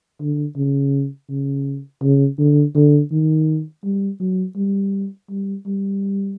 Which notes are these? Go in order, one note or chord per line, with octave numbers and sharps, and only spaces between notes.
D3
C#3
C#3
C#3
D3
D3
D#3
G3
F#3
G3
G3
G3